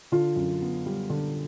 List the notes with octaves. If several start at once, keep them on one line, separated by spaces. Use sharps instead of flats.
D3 F4
F#2
B3
G3
D3